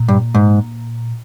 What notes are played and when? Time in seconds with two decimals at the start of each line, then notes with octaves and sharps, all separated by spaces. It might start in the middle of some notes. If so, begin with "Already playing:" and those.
Already playing: A#2
0.08 G2
0.35 G#2